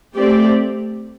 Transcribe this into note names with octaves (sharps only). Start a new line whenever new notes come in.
A3 C4 G4 D5